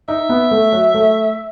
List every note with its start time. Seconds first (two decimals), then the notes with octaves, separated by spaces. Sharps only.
0.08 D#4 E5
0.29 B3
0.51 A3
0.72 F#3
0.94 A3